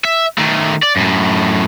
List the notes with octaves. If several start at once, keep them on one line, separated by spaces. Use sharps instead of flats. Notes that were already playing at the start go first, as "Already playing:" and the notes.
E5
D#3 A3
D5
F#2 A2